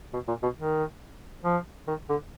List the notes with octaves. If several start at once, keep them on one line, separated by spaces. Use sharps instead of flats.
B2
A#2
B2
D#3
F3
D#3
D3